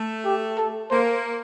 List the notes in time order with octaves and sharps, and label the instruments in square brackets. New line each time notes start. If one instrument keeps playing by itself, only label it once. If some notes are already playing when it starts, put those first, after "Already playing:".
Already playing: [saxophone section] A3
[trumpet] G4
A4
[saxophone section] A#3 [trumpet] C5